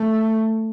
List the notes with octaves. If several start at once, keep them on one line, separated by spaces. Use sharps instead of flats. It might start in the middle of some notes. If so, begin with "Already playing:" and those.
Already playing: A3